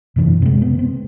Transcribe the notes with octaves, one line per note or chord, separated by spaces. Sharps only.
F#2 C3 E3 D4
C3 G#3
B3
C4